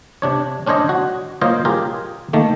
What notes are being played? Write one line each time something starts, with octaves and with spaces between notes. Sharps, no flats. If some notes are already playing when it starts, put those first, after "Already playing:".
C3 D4 C#5
C#4 D4 C5 C#5 D#5
F#4
A#3 F4 C5 C#5 D#5
F4 G4 G#4 A#4
D#3 A3 A#3